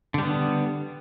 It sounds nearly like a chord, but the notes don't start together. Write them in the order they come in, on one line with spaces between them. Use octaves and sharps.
D3 G3 B3